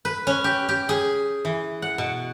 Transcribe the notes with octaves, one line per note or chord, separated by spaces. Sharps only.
B4
C#4
G4
G4
G#4
E3
F#5
B2